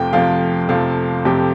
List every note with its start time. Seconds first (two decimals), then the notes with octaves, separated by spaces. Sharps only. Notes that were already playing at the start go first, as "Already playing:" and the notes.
Already playing: F2 C3 F3 A3 G5
0.13 F2 C3 F3 A3 F5
0.69 F2 C3 F3 A3 F5
1.25 F2 C3 F3 A3 G4